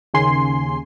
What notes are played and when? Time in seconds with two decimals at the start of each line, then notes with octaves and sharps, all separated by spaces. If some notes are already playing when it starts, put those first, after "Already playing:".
0.14 D#2 C#3 G#5 C6 C7